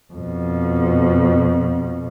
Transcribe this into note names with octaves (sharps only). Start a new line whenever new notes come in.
F2 B2